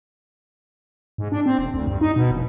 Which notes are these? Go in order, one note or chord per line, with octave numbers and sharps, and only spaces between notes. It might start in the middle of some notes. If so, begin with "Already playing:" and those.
G#2
D4
C4
E1
D2
G2
D#4
B2
F1